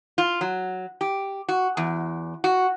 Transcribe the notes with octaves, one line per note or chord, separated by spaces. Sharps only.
F4
F#3
G4
F#4
E2
F#4